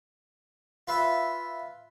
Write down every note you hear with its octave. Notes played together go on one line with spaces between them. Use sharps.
F4 B4 E5